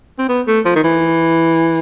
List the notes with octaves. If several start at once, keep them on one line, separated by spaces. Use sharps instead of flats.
C4
B3
A3
F3
D#3
E3